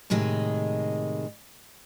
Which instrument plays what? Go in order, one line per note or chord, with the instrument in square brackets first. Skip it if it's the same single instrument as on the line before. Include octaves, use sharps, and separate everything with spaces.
[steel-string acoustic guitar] A2 C3 D#3 G#3